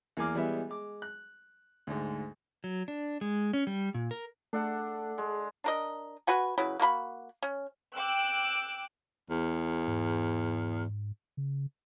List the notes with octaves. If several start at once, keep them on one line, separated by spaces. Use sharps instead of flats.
E2 A#3 G#5 D6 F6
E3 G3 G#3 B3 E5
G#3 D6
F#6
D2 G#2
F#3
D4
G#3
C#4
G3
A#2
A#4
A3 D4 A4 F#5
G#3
D4 A#4 D#5
F#4 B4 F#5 G#5
C#3 F#3 E4 B4
A#3 F#4 A#4 B5
C#4
G5 D6 E6 F#6
E2
G#2
C#3